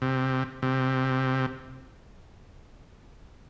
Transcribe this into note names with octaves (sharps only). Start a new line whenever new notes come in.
C3
C3